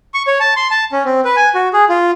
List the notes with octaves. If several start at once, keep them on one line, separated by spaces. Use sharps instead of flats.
C#6
C#5
A5
C6
A5
C#4
C4
B4
G#5
F#4
G#4
F4